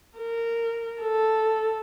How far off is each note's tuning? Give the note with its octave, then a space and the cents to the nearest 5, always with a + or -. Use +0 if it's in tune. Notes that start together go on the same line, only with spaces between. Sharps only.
A#4 -15
A4 +0